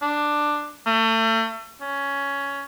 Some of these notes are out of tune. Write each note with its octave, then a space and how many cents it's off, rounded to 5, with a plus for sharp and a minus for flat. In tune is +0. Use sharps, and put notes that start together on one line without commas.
D4 +10
A3 +35
C#4 +10